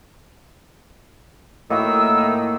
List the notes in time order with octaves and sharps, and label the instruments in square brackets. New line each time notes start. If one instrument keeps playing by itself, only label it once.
[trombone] A2 [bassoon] D#3 [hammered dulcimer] A#3 E4 F#4 [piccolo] E6